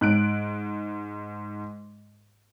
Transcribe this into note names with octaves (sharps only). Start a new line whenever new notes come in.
G#2 F#6 D7